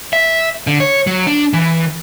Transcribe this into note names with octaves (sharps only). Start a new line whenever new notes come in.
E5
D3
C#5
F#3
D4
E3